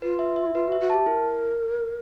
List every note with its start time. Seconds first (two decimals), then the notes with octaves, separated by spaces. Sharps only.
0.02 F4 B4
0.19 E5
0.36 E5
0.46 E4
0.54 F4 B4
0.68 F#4
0.72 E5
0.81 F#4
0.90 G4 A5
1.06 E4 A#4